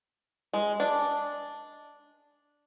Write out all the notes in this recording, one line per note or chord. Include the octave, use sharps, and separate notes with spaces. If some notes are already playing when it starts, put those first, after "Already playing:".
G#3
D4